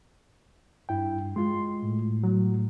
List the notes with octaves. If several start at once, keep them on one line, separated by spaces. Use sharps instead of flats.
G2 E4 G5
G#3 F4 C6
A2
F#3